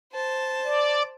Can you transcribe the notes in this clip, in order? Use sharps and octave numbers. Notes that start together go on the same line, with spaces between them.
C5 A5
D5